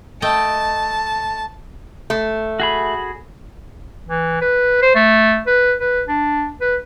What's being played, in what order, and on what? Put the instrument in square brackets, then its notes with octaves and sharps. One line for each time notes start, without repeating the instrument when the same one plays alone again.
[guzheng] A3 D#5 G5 [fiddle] A5
[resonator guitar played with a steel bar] A3
[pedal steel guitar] F#4 G#4 B5
[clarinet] E3
B4
C5
A3
B4
B4
D4
B4